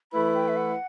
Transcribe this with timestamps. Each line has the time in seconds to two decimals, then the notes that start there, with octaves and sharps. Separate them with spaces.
0.12 E3 A3 E4 B4 B5
0.34 G5
0.48 E5
0.56 F#5